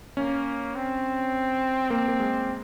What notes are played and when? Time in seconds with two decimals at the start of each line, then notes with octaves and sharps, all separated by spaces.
0.17 A#3 C#4
0.76 C4
1.90 A#3 C4
2.08 A#3
2.20 G#3